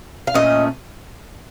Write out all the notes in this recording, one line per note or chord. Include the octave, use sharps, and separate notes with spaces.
F5
A#2 A3 C#4 D#5